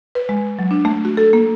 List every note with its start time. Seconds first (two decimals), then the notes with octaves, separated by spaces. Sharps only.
0.15 B4
0.29 G#3
0.59 F#3
0.71 D4
0.85 A3
1.05 F#4
1.17 A4
1.33 A#3